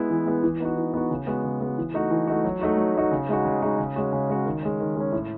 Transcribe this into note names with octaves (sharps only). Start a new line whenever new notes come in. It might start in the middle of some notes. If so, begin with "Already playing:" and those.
Already playing: G#3 B3 E4
E3
G#3 B3 E4
E3
B3 D#4 F#4
E3
B3 D#4 F#4
C#3
G#3 B3 F#4
C#3
G#3 B3 F#4
E3
A3 D#4 F#4
E3
A3 D#4 F#4
F#3
A3 D#4 F#4
F#3
A3 D#4 F#4
C#3
G#3 D#4 F#4
C#3
G#3 D#4 F#4
C#3
G#3 C#4 F#4
C#3
G#3 C#4 F#4
D#3
G#3 C#4
D#3
G#3 C#4
A2